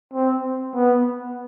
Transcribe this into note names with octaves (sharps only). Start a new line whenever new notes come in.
C4
B3